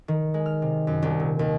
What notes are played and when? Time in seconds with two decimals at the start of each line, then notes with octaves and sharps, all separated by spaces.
0.08 D#3
0.34 G#3
0.46 F6
0.62 C3
0.87 F#2
1.02 C2
1.20 A#2
1.39 D#2